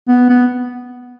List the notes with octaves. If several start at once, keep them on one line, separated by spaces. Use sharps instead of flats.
B3
B3